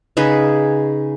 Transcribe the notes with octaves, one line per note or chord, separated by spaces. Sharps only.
C#3 D#4 G#4 B4